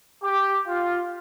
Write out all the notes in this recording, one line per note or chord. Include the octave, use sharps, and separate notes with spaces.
G4
F4